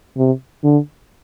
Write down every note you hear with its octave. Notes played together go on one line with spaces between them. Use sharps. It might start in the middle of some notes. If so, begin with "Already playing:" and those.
C3
D3